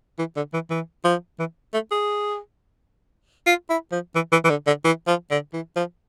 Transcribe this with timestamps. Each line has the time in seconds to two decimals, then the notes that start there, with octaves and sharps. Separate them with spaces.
0.19 E3
0.36 D3
0.54 E3
0.70 E3
1.05 F3
1.39 E3
1.74 A3
1.91 G#4
3.47 F4
3.70 E4
3.92 F3
4.15 E3
4.32 E3
4.44 E3
4.50 D3
4.67 D3
4.84 E3
5.07 F3
5.31 D3
5.53 E3
5.76 F3